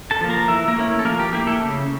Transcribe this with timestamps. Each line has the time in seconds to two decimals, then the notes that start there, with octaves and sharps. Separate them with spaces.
0.11 A4 A5
0.21 F3 A#3
0.30 A#4 A#5
0.48 E3 E4 E5
0.68 A#3 A#4
0.77 A3 C#4 E4
0.99 A4
1.05 F3 A#3 A#4
1.19 G4
1.33 A#3 E4 G4
1.47 A3 A4
1.61 C#3